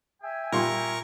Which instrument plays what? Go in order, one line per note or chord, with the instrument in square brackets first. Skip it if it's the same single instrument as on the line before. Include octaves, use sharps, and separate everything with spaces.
[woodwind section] E5 G5 G#5
[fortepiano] A#2 G3 C6 [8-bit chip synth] A#4 C#6